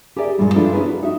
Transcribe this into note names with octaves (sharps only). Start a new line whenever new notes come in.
G4 G#4 A#4 D5 E5
G2 A#2 C#3 F3 G3 G#3
F3 D4 E4 F4 A4 B4
C#4 E4 F4 G#4 A#4 B4
F#4
D#4 F#4 E5